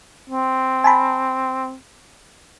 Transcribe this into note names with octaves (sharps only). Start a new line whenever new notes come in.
C4
G#5 A5 B5